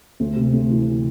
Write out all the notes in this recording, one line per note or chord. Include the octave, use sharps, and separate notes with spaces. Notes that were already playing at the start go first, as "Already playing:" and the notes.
D2
C3
D2
E3